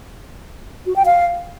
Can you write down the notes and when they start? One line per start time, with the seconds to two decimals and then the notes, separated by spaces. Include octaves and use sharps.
0.86 F#4
0.96 G5
1.06 F5